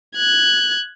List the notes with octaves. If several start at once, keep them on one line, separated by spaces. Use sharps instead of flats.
F#6 G#6